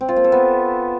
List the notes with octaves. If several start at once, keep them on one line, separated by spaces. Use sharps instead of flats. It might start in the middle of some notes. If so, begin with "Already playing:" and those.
C4
F4
A#3
A4
B3